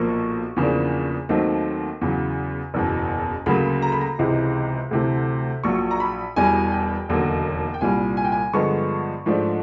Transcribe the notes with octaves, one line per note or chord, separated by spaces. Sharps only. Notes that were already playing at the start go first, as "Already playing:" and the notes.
Already playing: B1 A#2 F3 A#3 C#6
E2 C#3 F3 A#3 D4
D#2 D#3 F#3 A3 C4
E2 C#3 F#3
F#1 E2 B2
D2 C#3 F#3 A#3 B5
A#5
B5
A#5
C#2 C3 E3 G#3
D2 C3 E3 A3
A#1 A#2 F#3 C#6
A#5
B5
E1 E2 B2 G3 G#5
G5
E1 D#2 D3 F#3
G5
C2 A#2 G3 G#5
G#5
G5
G#5
G2 D3 F3 G#3 B3 C#6
G#2 F3 A3 D4